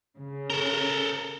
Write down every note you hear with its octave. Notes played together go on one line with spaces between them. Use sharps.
C#3
A4 A#4